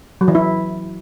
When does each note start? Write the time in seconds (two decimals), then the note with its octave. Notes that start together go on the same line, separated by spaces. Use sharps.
0.21 F#3
0.28 E3
0.35 E4